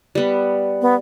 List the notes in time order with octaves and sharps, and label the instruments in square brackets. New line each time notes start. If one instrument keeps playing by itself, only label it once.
[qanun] G3 B3
[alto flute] B3